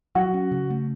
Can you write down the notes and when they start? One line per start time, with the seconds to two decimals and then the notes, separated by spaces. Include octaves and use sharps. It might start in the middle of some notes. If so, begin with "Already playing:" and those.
0.15 F#3 F#4
0.34 C#4
0.52 C#3
0.70 A3